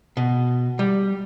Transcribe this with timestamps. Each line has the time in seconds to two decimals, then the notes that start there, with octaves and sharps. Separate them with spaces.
0.17 B2
0.79 G3